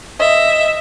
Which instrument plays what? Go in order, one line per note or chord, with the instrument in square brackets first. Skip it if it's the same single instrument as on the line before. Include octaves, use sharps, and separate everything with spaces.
[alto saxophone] D#5 [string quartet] E5